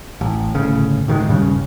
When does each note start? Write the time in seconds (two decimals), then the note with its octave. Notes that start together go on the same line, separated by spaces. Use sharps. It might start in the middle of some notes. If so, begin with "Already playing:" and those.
0.21 A1
0.55 G1 A2 C#3
1.08 A2 D#3 F#3 G#3
1.28 D#1 G2 C#3